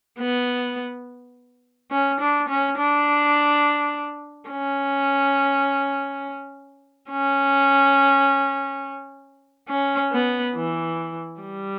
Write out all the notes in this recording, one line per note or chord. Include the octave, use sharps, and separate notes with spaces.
B3
C#4
D4
C#4
D4
C#4
C#4
C#4
B3
E3
G3